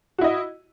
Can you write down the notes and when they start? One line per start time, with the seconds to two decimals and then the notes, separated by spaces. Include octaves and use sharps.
0.18 F#4
0.21 E4
0.24 D#5